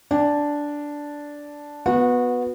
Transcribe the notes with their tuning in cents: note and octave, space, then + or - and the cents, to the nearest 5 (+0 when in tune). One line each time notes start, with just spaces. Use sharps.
D4 -5 G5 +45
B3 +0 F#4 -25